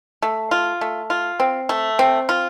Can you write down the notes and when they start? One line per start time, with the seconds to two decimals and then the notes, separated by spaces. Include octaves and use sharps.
0.22 A3
0.51 F4
0.81 A3
1.10 F4
1.40 C4
1.69 A3
1.99 C4
2.29 F4